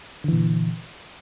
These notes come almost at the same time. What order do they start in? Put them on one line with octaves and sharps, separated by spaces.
D3 E3 A#2